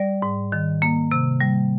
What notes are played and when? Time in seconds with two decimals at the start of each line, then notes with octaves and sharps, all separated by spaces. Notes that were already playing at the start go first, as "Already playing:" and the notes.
Already playing: G3 D5
0.22 G#2
0.52 D#3
0.82 A#3
1.11 C3
1.41 G3